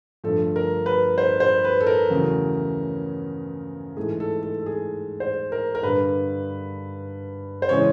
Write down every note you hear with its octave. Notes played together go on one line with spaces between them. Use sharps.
G2 D3 F3 A3 A4
A#4
B4
C5
C5
B4
A4
A#4
E2 C#3 F#3 A3
G#2 E3 A3 G#4
A4
A4
A4
G#4
C5
A#4
A#4
G2 D3 G3 B4
C5
C#3 E3 G#3 C#5